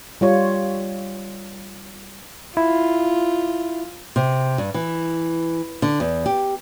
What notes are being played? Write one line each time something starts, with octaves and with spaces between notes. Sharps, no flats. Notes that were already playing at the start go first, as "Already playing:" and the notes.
G3 F4 C#5
E4 F4
C3
G2
E3
D3
E2
G4